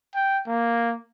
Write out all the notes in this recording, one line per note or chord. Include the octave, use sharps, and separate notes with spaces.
G5
A#3